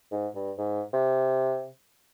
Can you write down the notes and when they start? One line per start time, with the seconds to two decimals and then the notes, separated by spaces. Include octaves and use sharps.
0.11 G#2
0.35 G2
0.58 G#2
0.93 C3